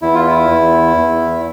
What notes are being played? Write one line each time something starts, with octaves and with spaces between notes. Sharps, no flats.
E2 E4
F4
E4
E2
E2